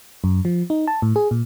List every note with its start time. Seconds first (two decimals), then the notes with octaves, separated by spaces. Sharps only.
0.24 F#2
0.45 F3
0.70 D#4
0.87 A5
1.02 A2
1.16 G#4
1.31 A#2